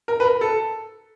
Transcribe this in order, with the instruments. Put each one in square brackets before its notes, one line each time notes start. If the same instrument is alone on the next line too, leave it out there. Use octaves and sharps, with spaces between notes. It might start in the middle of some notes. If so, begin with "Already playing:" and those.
[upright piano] A#4
B4
A#4
A4